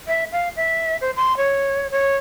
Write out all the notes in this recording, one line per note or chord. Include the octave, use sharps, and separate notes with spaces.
E5
F5
E5
C5
C6
C#5
C#5